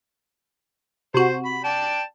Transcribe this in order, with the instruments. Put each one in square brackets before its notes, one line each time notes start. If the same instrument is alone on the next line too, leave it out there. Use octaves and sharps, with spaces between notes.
[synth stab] C3 F#4 [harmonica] C5
[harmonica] B5
D5 G5 A5